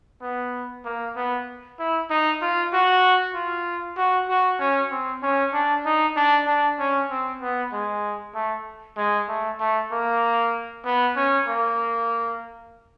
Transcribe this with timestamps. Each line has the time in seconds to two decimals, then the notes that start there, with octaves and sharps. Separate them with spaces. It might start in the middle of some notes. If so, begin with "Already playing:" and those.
0.22 B3
0.85 A#3
1.16 B3
1.79 E4
2.10 D#4
2.42 F4
2.73 F#4
3.34 F4
3.97 F#4
4.29 F#4
4.59 C#4
4.91 C4
5.23 C#4
5.53 D4
5.86 D#4
6.16 D4
6.47 D4
6.79 C#4
7.10 C4
7.41 B3
7.73 G#3
8.35 A3
8.98 G#3
9.29 A3
9.60 A3
9.92 A#3
10.85 B3
11.16 C#4
11.48 A#3